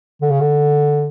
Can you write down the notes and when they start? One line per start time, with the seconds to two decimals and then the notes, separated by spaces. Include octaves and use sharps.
0.21 D3
0.30 C#3
0.40 D3